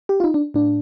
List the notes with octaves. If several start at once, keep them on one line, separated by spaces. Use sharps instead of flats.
G4
F4
D#4
D4
A2 D4